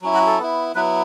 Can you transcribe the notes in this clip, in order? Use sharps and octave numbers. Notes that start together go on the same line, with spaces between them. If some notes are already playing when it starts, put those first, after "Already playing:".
F#3 C#4 E4
F#4
A4
B3 E4
F#3 B3 E4 B4